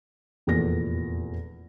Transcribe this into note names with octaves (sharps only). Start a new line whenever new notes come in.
F1 E2 A#2 A4 A#6